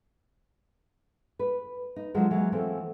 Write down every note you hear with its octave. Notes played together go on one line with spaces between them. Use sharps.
B4
D#4
D3 F3 F#3 G#3
E3 F#3 G#3 A#3
E3 F3 A3 C4